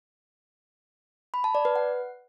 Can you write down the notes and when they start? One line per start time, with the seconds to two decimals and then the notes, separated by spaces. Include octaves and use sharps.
1.34 B5
1.44 A5
1.55 D5
1.65 B4
1.76 F#5